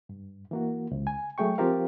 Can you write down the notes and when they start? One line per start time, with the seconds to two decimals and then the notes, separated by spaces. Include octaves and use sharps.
0.09 G2
0.51 E3 A#3 F#4
0.91 C#2
1.07 G#5
1.38 F#3 A3 G#4 G5 C#6
1.58 F3 C4 F4 G4 A#4 F5